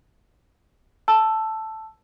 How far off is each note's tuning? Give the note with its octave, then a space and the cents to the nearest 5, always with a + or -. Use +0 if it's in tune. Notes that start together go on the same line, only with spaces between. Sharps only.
A5 +0 E6 +10